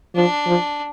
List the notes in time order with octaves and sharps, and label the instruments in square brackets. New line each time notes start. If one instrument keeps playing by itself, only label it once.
[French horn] F3 [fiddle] D4
[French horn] F3